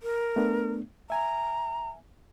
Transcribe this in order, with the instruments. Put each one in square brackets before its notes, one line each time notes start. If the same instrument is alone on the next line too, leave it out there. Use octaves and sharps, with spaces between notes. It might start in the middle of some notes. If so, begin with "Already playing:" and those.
[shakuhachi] A#4
[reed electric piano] A3 B3 D4
[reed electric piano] E5 G#5 [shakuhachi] A#5